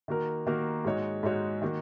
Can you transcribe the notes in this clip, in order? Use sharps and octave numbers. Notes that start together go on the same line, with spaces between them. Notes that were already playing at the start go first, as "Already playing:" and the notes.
D#3 A#3 F#4 A#4
D#3 A#3 F#4 A#4
G#2 G#3 D#4 F#4 C#5
G#2 G#3 D#4 F#4 C#5
D#3 A#3 F#4